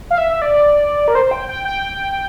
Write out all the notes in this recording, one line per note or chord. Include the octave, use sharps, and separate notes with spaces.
F5
E5
D5
A#4
C5
G5
G5
G5